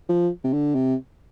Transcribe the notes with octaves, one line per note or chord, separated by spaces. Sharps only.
F3
C3
D3
C3